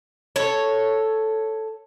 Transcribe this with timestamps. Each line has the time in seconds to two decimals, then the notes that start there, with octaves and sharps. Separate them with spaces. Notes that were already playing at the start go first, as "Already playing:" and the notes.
0.36 A4 C#5